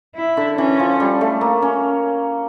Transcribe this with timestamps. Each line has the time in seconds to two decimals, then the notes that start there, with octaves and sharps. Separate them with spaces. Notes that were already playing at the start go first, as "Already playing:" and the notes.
0.16 E4
0.37 D3
0.58 E3 C#4
0.79 F3
1.00 G3
1.21 A3
1.41 A#3
1.62 C#4